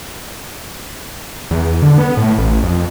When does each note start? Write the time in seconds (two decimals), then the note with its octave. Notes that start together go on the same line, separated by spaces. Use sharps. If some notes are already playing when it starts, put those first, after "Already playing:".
1.51 E2
1.82 D3
1.98 B3
2.17 A2
2.38 A1
2.63 F2